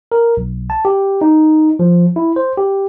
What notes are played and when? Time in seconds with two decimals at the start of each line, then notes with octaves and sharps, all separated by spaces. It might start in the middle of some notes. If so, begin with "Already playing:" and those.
0.12 A#4
0.37 B1
0.70 A5
0.85 G4
1.21 D#4
1.79 F3
2.16 E4
2.36 C5
2.58 G4